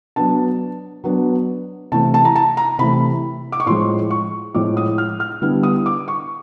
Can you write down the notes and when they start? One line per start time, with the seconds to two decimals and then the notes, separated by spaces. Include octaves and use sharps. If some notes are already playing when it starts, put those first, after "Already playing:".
0.16 F#3 B3 D4 A5
1.04 F#3 B3 D4
1.92 C3 E3 A3 A5
2.14 A5
2.25 A#5
2.36 A5
2.57 A#5
2.79 C3 E3 A3 B5
3.52 D6
3.60 C#6
3.66 A2 F3 G#3 C6
4.10 C#6
4.54 A2 F3 G#3 D6
4.77 D#6
4.98 F6
5.20 F6
5.42 D3 G3 B3 E4
5.63 D#6
5.86 D6
6.08 C#6